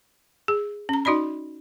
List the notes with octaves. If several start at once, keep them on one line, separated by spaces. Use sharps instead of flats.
G#4
C#4 A#5
D#4 F#4 D5 D#5 B5